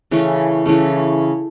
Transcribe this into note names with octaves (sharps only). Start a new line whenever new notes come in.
C#3 E3 A3 C#4
C#3 E3 A3 C#4